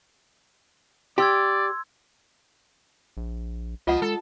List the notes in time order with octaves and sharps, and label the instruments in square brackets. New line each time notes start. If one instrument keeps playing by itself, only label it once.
[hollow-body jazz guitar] G4 [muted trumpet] D5 [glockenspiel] C6 E6 G#6
[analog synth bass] A#1
[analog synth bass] C#2 [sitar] F3 D#5 [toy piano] F4 F#5
[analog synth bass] G#3 [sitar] A4